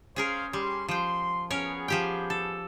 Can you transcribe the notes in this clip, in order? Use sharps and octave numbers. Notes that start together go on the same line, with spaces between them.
C#4 G#4 A#4 C5 F5
G3 C#4 G4 C6
F3 G5 C6
B3 C#4 G#4 A#4 C#5
F3 G4 G5
A4